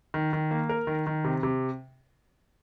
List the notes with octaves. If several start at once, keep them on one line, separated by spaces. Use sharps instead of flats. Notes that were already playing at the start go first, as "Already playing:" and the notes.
D#3
D#3
A#3
A#4
D#3
D#3
C3
C3